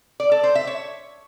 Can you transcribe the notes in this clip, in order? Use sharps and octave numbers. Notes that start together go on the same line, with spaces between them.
D5
A4
C5
E5
C#5